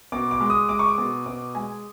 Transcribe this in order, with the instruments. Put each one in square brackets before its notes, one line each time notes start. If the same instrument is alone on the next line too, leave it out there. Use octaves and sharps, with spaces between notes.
[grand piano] B2 D6
D6
G#3
D#6
G#3 D6
C#6
D6
B2
B2 D6
G#3 G#5